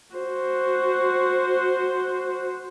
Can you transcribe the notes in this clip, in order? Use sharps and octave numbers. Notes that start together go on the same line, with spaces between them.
F#4 C5